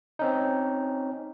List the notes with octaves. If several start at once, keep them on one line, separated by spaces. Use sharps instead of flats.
C4 C#4 D#4